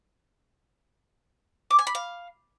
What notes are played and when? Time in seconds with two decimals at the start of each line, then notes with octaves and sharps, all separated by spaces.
1.71 D6
1.79 G#5
1.87 B5
1.95 F5